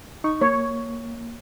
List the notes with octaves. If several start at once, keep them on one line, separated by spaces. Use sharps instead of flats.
D#4 C#6
A#3 C#5